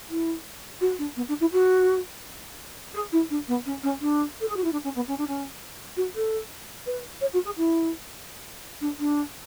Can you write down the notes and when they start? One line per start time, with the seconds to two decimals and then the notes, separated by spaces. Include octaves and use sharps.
0.09 E4
0.81 F#4
0.98 D4
1.16 B3
1.28 D4
1.40 E4
1.52 F#4
2.94 G#4
3.12 E4
3.30 D4
3.48 B3
3.66 C#4
3.83 C#4
4.00 D4
4.40 A4
4.48 G#4
4.56 F#4
4.64 E4
4.72 D4
4.84 C#4
4.95 B3
5.07 C#4
5.17 D4
5.27 C#4
5.96 F#4
6.14 A4
6.86 B4
7.21 C#5
7.33 F#4
7.45 G#4
7.57 E4
8.81 D4
8.99 D4